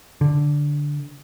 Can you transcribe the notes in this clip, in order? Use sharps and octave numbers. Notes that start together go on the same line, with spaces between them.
D3